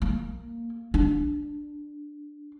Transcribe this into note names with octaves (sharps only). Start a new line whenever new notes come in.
A#3
D4